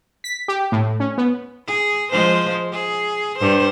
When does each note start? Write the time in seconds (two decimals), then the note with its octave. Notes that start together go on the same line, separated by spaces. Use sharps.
0.24 B6
0.48 G4
0.72 A2
1.00 C#4
1.18 B3
1.67 G#4
2.11 F3 G#3 C5
2.72 G#4
3.38 G2 C5